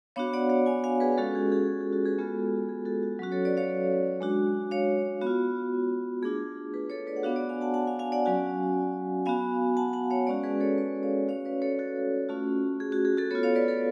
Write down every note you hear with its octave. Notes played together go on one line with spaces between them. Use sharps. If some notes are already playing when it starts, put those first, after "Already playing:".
B3 D4 F#4 C#5 F5
D5 F#5
C#5 F5
F5 G#5
F5 G#5
G#4 B4
G#3 C#4 F4 F#4 A4
G#4
G#4
G#4
F#4 A4
G#4 B4
G#3 B3 F4 F#4 A4
G#4
F#4 A4
F#4
F#3 C#4 F#4
A4 C#5
B4 D5
C#5 F5
G#3 D4 F#4
C#5 F5
B3 F#4
F4
A3 D4 F4 G#4
G#4 B4
A4 C#5
B4 D5
F#5
B3 D4 F#4 C#5 F5
D5 F#5
F5 G#5
F#5 A5
F#5 A5
F5 G#5
F5 G#5
D5 F#5
F#3 C#4 F#4 F5 G#5
B3 F#4 F5 G#5
F#5 A5
F#5 A5
C#5 F5
G#3 C#4 F#4 B4 D5
G#4 B4
A4 C#5
B4 D5
C#5 F5
A3 C#4 F#4 C#5 F5
B4 D5
A4 C#5
F#4 A4
A3 C#4 F4 F#4
G#4
F#4
G#4
F#4 A4
B3 F4 A4 C#5
C#5 F5
B4 D5
A4 C#5